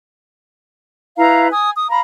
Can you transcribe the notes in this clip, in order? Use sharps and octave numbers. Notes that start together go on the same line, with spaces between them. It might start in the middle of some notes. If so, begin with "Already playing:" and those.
E4 B4 F5 A#5
G#5 D#6
D#6
F5 A#5 B5